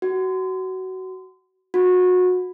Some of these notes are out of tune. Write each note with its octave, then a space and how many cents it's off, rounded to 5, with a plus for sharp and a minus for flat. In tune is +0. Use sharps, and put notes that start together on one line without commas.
F#4 +20
F#4 -25